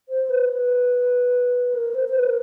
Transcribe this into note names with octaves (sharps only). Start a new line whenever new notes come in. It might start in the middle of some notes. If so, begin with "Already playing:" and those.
C5
B4
B4
A#4
C5
C5
B4
A#4